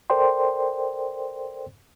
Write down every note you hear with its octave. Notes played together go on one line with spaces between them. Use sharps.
A4 A#4 C5 D5 G5 C6